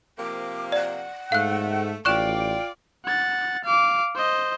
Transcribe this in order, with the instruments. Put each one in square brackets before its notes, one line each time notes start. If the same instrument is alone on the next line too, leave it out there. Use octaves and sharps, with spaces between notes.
[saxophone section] C3 F3 A#3 [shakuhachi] D6
[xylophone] D5 [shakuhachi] F#5
[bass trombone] G#2 [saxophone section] A3 [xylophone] F5 F#6
[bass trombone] A1 [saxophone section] F4 D5 [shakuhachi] G5 [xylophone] C#6 F#6 E7
[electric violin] F#5 A6
F5 D6
C5 D#5